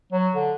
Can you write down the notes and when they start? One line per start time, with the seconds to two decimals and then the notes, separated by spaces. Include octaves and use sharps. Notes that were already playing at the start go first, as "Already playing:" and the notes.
0.12 F#3
0.35 D3